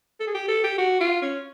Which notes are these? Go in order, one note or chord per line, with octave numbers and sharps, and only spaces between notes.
A4
G#4
G4
A4
G4
F#4
F4
C#4